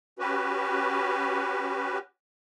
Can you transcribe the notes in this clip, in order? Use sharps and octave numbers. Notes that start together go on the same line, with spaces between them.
C#4 F#4 G4 B4